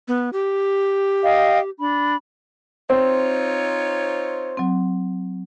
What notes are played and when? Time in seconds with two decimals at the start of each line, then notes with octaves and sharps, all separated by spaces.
0.08 B3
0.33 G4
1.22 D#5 F5 G5
1.79 D4 B5
2.90 C4 D#4 F4 C#5
4.57 F#3 C4